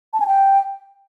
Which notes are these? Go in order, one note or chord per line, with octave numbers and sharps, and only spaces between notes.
A5
G#5
G5